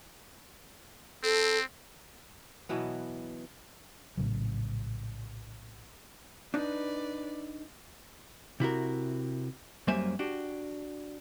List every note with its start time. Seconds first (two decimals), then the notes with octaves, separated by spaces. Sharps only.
1.24 C4 A4
2.69 B2 E3 F#3 B3
4.17 A#1 A2 C#3 F#3
6.54 D4 D#4 B4 D5
8.60 C3 E4 F#4 A#4
9.87 F#2 G3 A#3 C5 E5 G#5
10.19 D4 F#4 G4